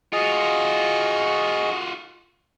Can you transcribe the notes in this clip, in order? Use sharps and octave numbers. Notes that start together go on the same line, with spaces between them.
F4 F#4 G#4 D#5